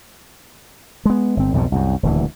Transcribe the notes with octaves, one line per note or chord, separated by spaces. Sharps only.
G#3 B3
G1 C4
B1 F2 G#2 B2
C2 F#2
D#1 D2 E3